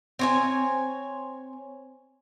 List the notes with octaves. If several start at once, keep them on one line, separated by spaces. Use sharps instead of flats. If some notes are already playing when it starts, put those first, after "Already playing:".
C4 C#5 G#5